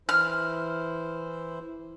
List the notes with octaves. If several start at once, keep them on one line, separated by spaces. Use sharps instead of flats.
E3 E4 C5 F6